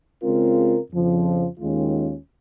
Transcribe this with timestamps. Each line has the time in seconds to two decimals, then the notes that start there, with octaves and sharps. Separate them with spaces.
0.23 C#3 G#3 C4 F4 A#4
0.92 F2 C#3 F3
1.60 D#2 D#3 G#3 C#4 F4